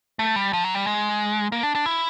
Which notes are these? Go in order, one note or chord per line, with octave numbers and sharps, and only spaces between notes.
A3
G3
F3
F#3
G3
G#3
A#3
D4
D4
E4